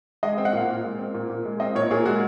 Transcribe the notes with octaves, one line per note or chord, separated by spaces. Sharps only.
G#3 D#5
C4
F#5
A#2 F5
A#2
G#3
C4
A#2
A#2
G#3
C4 D#5
A#2 C#5
A#2 G#4
G#3 F#4